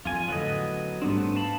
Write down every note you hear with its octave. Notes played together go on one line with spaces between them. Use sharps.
F2 F4 G#5
A2 D3 F#3 B3 D#5
G#2 G3 A3 B3 C4 D4
F5 A5 B5